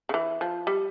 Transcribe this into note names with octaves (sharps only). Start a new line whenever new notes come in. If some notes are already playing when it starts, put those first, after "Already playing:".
C#3
E3
F3
G3